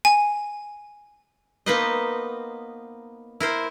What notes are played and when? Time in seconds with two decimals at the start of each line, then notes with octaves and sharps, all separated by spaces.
0.05 G#5
1.66 A#3 B3 D#4 B4 C5 D#5
3.40 E4 A#4 C5